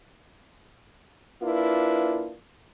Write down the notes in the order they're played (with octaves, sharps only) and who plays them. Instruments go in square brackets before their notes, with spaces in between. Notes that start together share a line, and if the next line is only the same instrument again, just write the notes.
[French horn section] A#3 D4 E4 F4 B4